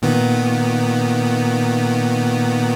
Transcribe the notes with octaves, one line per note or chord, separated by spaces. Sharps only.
A#2 D#3 B3